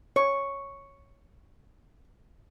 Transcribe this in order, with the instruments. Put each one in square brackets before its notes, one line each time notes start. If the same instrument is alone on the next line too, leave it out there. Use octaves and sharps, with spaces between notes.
[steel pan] C#5 [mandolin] C#6